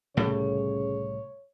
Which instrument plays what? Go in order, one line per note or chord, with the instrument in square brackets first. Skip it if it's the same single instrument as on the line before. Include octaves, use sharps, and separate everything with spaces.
[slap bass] C2 A2 G3 [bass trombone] C#3 [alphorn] C#5